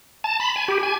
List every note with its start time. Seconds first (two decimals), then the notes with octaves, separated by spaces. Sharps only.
0.24 A5
0.40 B5
0.56 G#5
0.68 G4
0.83 G#5